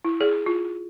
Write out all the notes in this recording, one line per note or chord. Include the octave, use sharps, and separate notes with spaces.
E4
G#4
F4